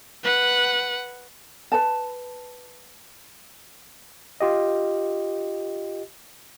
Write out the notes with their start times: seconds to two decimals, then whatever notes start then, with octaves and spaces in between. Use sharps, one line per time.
0.24 B4 F#5
1.72 B4 A5
4.41 F4 G4 D#5